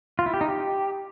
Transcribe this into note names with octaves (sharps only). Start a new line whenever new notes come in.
F4
E4
G4
D#4
G4